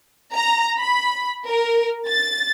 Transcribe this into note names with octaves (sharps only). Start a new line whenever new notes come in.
A#5
B5
A#4
A6